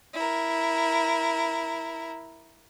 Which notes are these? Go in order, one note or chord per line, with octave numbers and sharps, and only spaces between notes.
E4 A#4